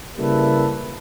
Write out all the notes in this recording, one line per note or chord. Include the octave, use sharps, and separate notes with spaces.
C#3 G3 A#3 E4 A4 B4